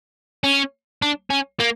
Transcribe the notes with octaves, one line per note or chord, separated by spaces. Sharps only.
C#4
D4
C#4
A#3